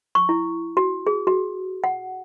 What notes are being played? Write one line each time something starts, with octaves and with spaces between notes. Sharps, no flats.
C#6
E4
F#4
G#4
F#4
F#5